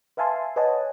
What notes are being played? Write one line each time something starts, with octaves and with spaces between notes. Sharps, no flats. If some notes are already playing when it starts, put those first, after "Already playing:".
B4 E5 F5 G#5 A5 C6
B4 C#5 D#5 F#5 G#5 A5